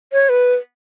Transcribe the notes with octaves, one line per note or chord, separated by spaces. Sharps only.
C#5
B4